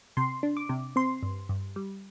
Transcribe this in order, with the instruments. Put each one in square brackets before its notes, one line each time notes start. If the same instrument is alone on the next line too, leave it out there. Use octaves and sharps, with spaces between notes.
[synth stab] C3 C6
D4
D6
C3
C4 C6
G2
G2
G3